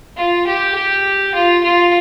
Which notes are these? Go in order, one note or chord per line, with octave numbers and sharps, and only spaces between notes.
F4
G4
G4
F4
F4